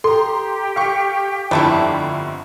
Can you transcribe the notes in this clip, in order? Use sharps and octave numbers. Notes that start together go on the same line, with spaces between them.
G4 A4 A#5 C6
F5 C#6
G1 F2 D3 G3 A3 E4